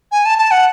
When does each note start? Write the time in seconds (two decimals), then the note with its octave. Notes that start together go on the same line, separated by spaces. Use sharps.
0.12 G#5
0.25 A5
0.39 A5
0.51 F#5